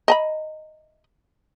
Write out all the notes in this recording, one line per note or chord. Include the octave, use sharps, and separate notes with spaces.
D#5 A5 B5